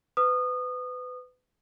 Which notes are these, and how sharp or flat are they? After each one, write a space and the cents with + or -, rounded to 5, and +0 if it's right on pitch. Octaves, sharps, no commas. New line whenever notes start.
B4 +30 D#6 -25